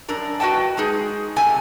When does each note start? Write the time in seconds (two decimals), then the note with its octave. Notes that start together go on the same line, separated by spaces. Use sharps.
0.08 F#2 D4 A#4 A#5
0.40 F#4 B4 D#5 G5 A5
0.77 G#3 D#4 G#4
1.36 F#2 C3 A3 G#5